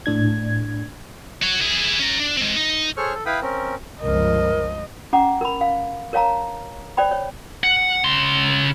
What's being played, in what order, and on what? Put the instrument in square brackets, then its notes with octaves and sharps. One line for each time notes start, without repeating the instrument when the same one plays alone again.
[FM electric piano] A2 D4 G#6
[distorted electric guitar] F#4 C#5
E4 G#4
C#4 A#5
D4
G#3 C4
D#4
[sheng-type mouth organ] G#4 A4 C5 C#5 C#6 F6
A4
E4 B4 F5 G5 B5 D#6
C4 C#4 A#4
[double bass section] G1 C#2 F3 [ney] A#4 [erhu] D#5
[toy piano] C#4 F#5 A#5 D6
A#4 B5
F5
A#4 C#5 F5 A5 A#5
C5 D5 G5 B5
C#5
[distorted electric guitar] F#5
C#3 C6